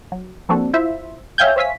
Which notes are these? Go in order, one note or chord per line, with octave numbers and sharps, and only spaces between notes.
F#3
F3 A#3 C4 D4 F#4 A4
E4 F4 C5 E5
C#5 E5 F5 G5 G#5 G6
C5 C#5 E5 F5 G#5 B6